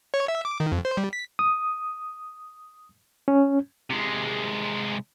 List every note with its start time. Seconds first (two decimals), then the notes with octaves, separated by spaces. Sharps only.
0.14 C#5
0.28 E5
0.45 D6
0.60 D#3
0.72 F2
0.85 C5
0.97 G3
1.13 B6
1.39 D#6
3.28 C#4
3.90 C3 G#3